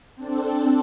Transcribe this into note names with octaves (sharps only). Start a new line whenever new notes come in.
C4 D4 A4